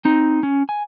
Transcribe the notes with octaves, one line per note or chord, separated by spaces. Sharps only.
C4 D#4
C#4
G#5